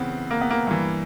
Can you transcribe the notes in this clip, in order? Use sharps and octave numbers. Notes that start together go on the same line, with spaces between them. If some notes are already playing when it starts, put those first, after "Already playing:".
Already playing: C#3 E3 B3 C4
A#3
B3
A#3
G2 E3